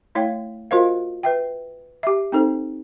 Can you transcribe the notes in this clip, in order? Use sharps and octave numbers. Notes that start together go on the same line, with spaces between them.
A3 E4 C#5 F5 G5
F4 F#4 A#4 C5 D#5 F5
B4 E5 G5
G4 E5
C4 D#4 A4 C5